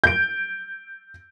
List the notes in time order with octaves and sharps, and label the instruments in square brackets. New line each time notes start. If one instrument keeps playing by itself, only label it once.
[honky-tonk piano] G6 D7